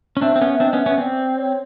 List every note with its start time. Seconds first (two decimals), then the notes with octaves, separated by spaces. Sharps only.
0.17 C#4
0.21 C4 D4 E5
0.36 C4
0.41 B3 C#4
0.54 E5
0.60 C4 D4
0.67 D#5
0.73 B3 C#4
0.80 E5
0.86 B3 C#4
0.98 C4 D5
1.38 C#5